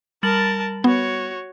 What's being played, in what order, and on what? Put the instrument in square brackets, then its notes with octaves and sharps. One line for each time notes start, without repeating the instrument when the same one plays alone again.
[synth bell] G3 A6 F#7 [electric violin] A#4 A5
[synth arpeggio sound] B3 [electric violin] F#4 C#5